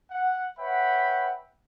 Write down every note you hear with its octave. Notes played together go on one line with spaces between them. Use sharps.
F#5
B4 C#5 E5 F#5 G5 B5